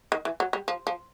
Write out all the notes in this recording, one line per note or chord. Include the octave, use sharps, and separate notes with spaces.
D#3
E3
F#3
G3
F3
F3